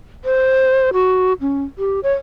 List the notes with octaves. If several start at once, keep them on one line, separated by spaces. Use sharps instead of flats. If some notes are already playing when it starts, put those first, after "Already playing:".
C5
F#4
C#4
G4
C#5